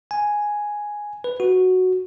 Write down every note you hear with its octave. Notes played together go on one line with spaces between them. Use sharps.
G#5
B4
F#4